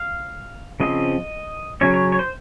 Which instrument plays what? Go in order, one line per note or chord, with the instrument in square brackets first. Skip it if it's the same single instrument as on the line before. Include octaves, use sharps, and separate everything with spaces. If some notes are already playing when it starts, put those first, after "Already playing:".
Already playing: [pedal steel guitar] F5
C#3 F3 C4 D#5
C#3 F#3 C#4 C#5
C#5
C#5
C5